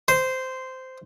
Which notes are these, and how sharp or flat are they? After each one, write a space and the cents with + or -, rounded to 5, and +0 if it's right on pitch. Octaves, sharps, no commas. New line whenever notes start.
C5 -10